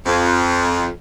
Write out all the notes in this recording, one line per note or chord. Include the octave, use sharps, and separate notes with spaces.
F2